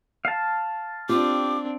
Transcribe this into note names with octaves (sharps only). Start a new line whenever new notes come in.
F5 A5
C4 D4 F4 G4 D6